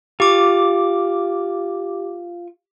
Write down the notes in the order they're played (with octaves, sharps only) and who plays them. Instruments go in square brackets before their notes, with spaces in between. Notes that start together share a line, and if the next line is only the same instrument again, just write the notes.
[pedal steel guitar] F4 C#6 [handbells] G4 D6